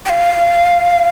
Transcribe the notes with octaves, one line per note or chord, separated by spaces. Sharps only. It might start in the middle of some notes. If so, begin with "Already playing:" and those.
G5
F5